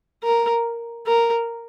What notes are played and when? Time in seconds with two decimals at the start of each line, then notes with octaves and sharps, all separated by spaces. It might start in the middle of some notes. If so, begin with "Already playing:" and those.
0.23 A#4
1.07 A#4